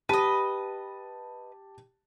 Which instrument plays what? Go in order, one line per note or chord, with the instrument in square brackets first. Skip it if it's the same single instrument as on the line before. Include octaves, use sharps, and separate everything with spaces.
[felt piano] G4 A5 D#7 [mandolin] B4 D#5